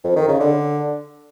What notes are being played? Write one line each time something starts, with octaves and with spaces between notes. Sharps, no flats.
F2
D#3
C#3
D3